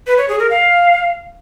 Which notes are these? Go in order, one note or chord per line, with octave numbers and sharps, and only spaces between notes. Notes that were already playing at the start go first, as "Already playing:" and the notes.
B4
C#5
G#4
A#4
F5